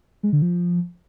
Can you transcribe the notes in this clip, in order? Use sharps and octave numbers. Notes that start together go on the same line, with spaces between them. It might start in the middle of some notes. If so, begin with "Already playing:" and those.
G#3
D3
F3